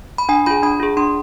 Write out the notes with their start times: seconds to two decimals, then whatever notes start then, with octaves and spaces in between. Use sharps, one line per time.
0.18 B5
0.29 D4 G#5
0.46 F4 G#4 B5
0.63 D4 B5
0.80 F4 G#4
0.97 D4 C6